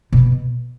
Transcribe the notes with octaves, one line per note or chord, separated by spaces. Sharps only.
B2